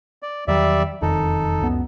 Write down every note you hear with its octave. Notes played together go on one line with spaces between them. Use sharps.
D5
E2 D#3 F#3 G3 D5 E5
E1 F2 D#3 D#4 A4
C#2 F#2 B3